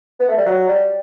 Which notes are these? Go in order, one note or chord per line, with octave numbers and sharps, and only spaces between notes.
B3
A3
G3
F#3
G3